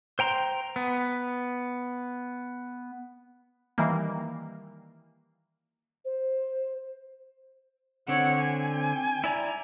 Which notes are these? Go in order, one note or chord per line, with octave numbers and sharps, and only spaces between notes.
C5 G5 A#5 C6
B3
D#3 E3 G3 A#3
C5
D3 C4 C#5 F#5
G#5
E4 D5 A#5